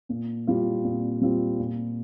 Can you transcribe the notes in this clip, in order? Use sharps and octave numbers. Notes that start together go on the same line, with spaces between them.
A#2
G3 C4 F4
A#2
G3 C4 F4
A#2